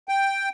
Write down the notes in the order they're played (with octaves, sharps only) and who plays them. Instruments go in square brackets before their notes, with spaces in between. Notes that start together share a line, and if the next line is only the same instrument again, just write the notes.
[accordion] G5